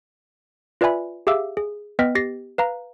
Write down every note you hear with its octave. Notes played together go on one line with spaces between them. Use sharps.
F4 B4 D5 E5 G#5 B5
G4 G#4 E5 F5 D6 E6
G#4
B3 B4 D#5 G5 F6 B6
G4 A6 A#6 C7
B4 F5 A#5